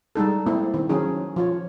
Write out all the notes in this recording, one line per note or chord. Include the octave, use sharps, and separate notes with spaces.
G3 G#3 D#4 A4
A#3 C4 E4
D#3 C4
D#3 F#3 C#4 D#4 G#4
F3 F4 C#5